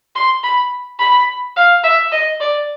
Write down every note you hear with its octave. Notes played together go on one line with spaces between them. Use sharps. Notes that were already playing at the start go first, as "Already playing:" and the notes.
C6
B5
B5
F5
E5
D#5
D5